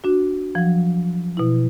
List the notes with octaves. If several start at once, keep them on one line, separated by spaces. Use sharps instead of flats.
D4 F#4
F3 F#3
B2 E4